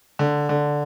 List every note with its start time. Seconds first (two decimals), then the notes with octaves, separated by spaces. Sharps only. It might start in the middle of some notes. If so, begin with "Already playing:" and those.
0.19 D3
0.49 D3